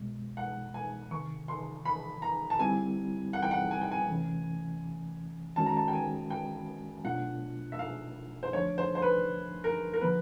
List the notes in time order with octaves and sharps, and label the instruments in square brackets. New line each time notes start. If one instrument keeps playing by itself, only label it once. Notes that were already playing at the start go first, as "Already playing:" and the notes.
Already playing: [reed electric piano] C2 B2 G#3
[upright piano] F#5
G#5
[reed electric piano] C#2 C3 D#3 [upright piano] C#6
[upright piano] C6
B5
A#5
A5
[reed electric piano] D3 G3 C4 E4 G4 [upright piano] G#5
[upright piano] F#5
G5
F#5
G#5
G5
G#5
[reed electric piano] D2 C3 E3 A3 C#4
[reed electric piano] D#3 G#3 C#4 F#4 [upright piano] A5
[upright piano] A#5
A5
G5
G#5
G5
[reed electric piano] B2 F#3 A3 D4 F4 [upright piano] F#5
[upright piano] E5
F5
C5
[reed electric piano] D2 D3 F3 A3 D4 [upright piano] C#5
[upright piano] C5
C5
B4
A#4
A#4
[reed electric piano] D3 F3 A#3 [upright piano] B4